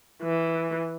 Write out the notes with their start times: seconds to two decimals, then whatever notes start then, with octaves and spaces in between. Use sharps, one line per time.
0.22 E3